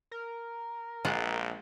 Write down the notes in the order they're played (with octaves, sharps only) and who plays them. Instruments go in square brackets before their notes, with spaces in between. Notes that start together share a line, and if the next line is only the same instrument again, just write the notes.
[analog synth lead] A#4
[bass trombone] A#1 [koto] G#3 F4 F#5